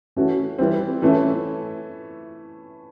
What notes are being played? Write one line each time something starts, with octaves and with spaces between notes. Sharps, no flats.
E3 A3 C#4 F#4
E3 G3 C4
E3 A3 C#4 E4